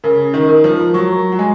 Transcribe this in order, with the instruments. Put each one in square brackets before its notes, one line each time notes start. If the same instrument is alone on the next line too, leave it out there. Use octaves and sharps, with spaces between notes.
[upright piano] C#3 [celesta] A#4
[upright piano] D#3
[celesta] A#4
[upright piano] F3
[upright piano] F#3 [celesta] C#6
[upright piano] F#3
[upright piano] G#3 [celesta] G#5